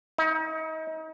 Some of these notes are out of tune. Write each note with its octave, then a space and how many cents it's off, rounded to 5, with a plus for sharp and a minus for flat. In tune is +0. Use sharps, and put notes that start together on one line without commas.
D#4 +35